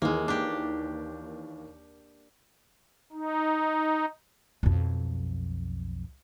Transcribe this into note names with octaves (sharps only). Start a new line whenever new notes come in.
D#2 D#3 E3 G#3 A#3
D4 G4
D#4
B1 F2